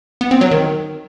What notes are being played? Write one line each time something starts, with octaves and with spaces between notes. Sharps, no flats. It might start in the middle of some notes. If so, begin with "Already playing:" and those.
B3
C4
F#3
D#3